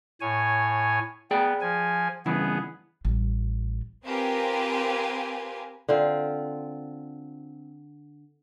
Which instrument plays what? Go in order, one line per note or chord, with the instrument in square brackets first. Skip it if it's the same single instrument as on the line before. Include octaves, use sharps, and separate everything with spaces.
[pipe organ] A2 C#5 G#5
[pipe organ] B3 [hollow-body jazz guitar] G#4 D5 G5
[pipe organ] F3 G#5
[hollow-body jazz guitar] G2 C#3 E3 [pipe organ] B3 G#4
[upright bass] A1 G3
[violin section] C4 F4 G4 A#4 B4 G#5
[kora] D3 C4 F4